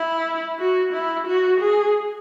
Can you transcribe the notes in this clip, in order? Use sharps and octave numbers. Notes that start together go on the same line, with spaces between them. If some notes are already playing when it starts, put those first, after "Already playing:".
Already playing: E4
F#4
E4
F#4
G#4